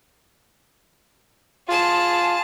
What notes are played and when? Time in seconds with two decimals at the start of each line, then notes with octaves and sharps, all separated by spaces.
1.68 F4 G#4 A5